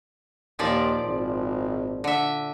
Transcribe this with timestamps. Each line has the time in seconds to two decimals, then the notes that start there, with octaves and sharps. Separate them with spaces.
0.59 D#2 A#2 F3 D5
1.04 G#1
2.04 D3 E5